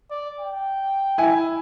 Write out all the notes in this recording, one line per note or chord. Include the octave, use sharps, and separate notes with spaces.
D5
G5
E4 G#5